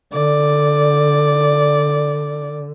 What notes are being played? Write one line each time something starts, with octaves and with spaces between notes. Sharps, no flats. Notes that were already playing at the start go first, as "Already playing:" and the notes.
D3 D5